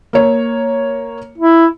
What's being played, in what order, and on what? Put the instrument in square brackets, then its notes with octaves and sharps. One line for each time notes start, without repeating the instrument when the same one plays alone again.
[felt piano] A#3 C#5
[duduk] E4